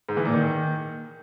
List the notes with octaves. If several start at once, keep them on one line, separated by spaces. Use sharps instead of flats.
G#2
E3
A#2
D#3